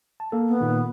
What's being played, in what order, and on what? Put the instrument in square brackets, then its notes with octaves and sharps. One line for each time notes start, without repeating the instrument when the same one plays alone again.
[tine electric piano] A5
A#3 A4
[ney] B3
[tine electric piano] A#2 D#3